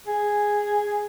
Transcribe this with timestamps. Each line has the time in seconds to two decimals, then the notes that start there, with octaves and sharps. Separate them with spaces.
0.07 G#4